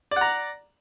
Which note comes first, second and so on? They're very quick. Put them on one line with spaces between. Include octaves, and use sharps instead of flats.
D5 F#5 A#5